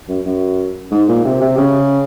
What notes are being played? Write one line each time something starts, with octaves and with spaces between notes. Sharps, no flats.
F#2
F#2
G#2
A#2
C3
C3
C#3